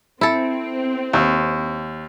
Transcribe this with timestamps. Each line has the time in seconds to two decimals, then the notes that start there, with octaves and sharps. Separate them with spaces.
0.21 C4 E4 A4
1.13 D#2